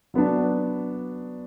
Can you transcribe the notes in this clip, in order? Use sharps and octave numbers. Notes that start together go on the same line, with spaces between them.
F#3 B3 D4